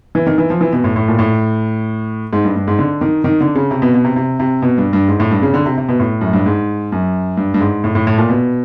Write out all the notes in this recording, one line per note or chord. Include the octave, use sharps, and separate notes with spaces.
E3
D#3
E3
F3
E3
B2
A2
A2
A#2
A2
G#2
G2
G2
G#2
D3
D#3
D#3
D3
C#3
C3
B2
B2
C3
C3
C3
B2
G2
G2
G#2
A2
G2
C#3
D3
C3
C3
B2
A2
F#2
G2
G#2
F#2
G2
G2
G#2
A2
A2
A2
A#2
B2